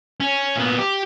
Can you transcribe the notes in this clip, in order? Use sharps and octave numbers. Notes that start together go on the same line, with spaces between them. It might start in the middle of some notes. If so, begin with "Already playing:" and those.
C#4
A#2 B3
G4